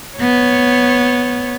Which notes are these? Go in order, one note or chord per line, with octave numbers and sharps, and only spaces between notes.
B3 C#5